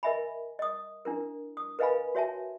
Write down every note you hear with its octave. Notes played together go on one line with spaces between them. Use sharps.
A#4 D#5 E5 G#5 B5
D#5 D#6
D4 E4 A#4
D#6
A#4 B4 D#5 F5 G#5 B5
F#4 C#5 E5 G#5 A5